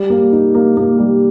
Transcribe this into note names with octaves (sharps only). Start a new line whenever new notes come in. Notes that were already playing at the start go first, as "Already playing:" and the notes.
Already playing: G3
A#3
D#4
A#3
A#3
G3